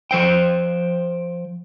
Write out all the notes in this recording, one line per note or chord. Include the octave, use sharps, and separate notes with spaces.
F3 C5 G5